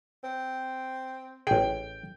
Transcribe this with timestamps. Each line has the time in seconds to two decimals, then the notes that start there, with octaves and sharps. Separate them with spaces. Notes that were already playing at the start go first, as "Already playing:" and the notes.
0.24 C4
1.47 A1 G#4 G5